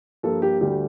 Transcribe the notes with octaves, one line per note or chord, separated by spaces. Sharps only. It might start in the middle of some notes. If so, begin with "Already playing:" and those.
G2 F3 A#3 A4
G4
D2 D3 G3 G4